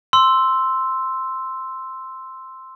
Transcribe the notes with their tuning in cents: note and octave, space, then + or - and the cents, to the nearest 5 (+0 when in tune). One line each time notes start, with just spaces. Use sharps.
C6 +0 E6 +0